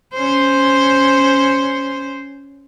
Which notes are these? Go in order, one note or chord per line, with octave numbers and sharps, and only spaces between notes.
C#4 C5